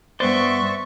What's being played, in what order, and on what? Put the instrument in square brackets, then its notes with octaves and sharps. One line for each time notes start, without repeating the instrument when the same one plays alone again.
[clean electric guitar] G2 B3 C5 [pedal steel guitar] D5 C6 [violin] E5 C#6